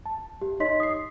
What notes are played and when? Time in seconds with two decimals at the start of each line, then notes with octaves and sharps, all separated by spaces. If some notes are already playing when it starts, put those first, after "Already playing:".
0.06 A5
0.41 G4
0.60 D#4 C#5 D#5 C6 B6
0.80 D#6 C7